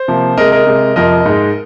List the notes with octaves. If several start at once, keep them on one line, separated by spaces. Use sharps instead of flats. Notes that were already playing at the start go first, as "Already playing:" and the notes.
Already playing: C5
C3 F3 A#3
C3 G#3 A#4 D#5
A#4 D#5
C3 G#3
F2 C3 F3 A#4 D#5
G#2 G#3